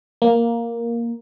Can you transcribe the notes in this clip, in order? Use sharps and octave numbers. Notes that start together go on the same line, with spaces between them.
A#3